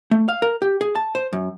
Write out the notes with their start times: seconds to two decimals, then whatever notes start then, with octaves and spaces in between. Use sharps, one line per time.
0.11 A3
0.29 F5
0.42 A#4
0.62 G4
0.81 G#4
0.95 A5
1.15 C5
1.33 F#2